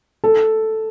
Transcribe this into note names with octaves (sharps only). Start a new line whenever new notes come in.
A4